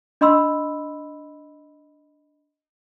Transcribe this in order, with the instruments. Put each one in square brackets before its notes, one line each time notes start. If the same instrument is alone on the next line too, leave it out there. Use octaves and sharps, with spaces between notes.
[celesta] D4 D#5 B5 C6 E6